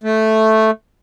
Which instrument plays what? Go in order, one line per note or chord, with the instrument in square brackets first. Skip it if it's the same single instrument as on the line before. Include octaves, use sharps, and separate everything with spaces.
[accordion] A3